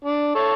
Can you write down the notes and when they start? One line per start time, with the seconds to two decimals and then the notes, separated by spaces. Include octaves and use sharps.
0.05 D4
0.35 A4 C#5